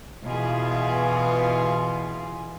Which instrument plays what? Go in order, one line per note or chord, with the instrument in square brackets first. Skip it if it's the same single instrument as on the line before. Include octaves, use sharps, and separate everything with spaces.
[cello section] B2 E3 F4 G#4